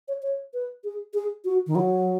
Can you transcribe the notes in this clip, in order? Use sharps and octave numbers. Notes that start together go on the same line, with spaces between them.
C#5
C#5
B4
G#4
G#4
F#4
D#3
F#3